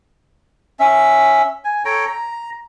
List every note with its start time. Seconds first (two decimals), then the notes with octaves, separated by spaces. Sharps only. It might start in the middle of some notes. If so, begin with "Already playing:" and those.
0.80 C#4 E5
1.65 G#5
1.85 A4 C#5 G5 A#5
2.07 A#5